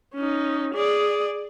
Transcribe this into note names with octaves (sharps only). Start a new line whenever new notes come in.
C#4 D#4
G#4 D5